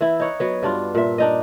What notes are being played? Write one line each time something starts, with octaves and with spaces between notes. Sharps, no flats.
E3 E4
D#4 C#5 F#5
F#3 B3
G2 D4 F4
A#2 E5
D4 D#4 D#5